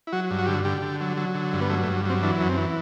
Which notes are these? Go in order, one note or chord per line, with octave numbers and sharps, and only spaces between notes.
E4
F#3 F#4
G2
F#4
D3 G4
F#4
D3 G4
D3
F#3
F#3
D3
G2
B3
F#3 A3
A3
G2
F#3 C4
E3 D4
F#2
C4
E3